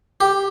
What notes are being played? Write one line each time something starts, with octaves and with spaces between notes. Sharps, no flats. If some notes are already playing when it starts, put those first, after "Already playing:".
G4